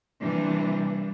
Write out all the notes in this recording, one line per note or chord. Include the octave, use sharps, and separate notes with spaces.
C3 E3 G3 A#3 D4